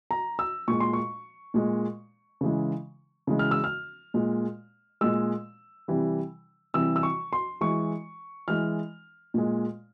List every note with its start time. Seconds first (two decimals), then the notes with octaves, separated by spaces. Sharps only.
0.11 A#5
0.39 E6
0.68 A#2 G#3 C#6
0.80 C6
0.93 C#6
1.54 A#2 G#3
2.41 C#3 E3 G#3
3.27 C#3 E3 G#3
3.39 F6
3.51 E6
3.64 F6
4.14 A#2 G#3
5.01 A#2 G#3 E6
5.88 C3 E3 G3
6.74 C3 E3 G3 E6
6.96 E6
7.03 C#6
7.33 C6
7.61 E3 G#3 C#6
8.48 E3 G#3 F6
9.34 A#2 G#3